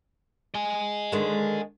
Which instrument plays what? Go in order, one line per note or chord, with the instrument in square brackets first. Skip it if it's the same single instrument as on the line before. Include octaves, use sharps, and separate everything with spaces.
[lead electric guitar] D#5 G#5
[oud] D3 D#3 G#3